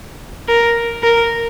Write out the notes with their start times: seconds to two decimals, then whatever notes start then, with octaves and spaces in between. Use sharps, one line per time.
0.49 A#4
1.03 A#4